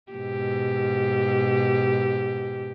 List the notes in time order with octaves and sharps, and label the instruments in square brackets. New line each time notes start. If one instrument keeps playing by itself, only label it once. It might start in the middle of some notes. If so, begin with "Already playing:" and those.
[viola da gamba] G#2 B2 G4